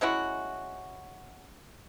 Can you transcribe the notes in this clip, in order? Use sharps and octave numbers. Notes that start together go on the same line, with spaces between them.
G#3 C#4 E4 F#4